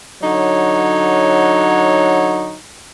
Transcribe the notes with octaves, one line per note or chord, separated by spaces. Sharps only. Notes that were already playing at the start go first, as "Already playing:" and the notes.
D3 F#3 D#4 C#5